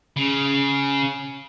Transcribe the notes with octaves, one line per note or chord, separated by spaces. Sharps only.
C#3